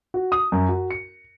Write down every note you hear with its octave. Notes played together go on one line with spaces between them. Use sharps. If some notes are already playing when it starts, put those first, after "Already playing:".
F#4
D#6
F#2
F#4
C#7